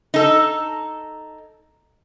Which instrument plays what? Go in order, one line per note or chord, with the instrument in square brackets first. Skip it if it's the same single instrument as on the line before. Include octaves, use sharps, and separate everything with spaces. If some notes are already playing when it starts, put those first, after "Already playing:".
[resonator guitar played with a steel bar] D#4 A4